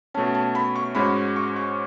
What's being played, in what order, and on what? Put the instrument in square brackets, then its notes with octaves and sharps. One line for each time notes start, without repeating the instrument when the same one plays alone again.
[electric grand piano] B2 A3 C#4 [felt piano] A5
[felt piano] A5
B5
C#6
[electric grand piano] G#2 G#3 C#4 F#4 [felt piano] B5
[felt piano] C#6
C#6